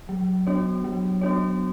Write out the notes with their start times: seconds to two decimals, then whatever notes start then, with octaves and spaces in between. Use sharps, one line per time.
0.09 F#3
0.47 B3 D4 F#4 C#5
0.84 F#3
1.21 B3 D4 F#4 C#5